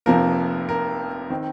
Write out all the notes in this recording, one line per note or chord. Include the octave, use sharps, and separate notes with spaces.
F1 F2 C3 F3 A#3 A#4
A#4
D#3 C4